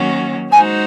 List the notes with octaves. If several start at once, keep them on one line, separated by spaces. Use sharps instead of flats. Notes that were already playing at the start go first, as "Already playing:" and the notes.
Already playing: D#3 F#3 A#3 C#4 F#4
G#3 D#4 F#4 C5 G#5